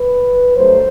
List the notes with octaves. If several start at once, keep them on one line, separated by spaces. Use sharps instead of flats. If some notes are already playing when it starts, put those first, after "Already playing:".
Already playing: B4
G2 D3 F#3 A3 C5